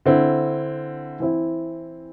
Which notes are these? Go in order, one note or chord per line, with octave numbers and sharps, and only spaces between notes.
D3 C4 E4
E3 C4 E4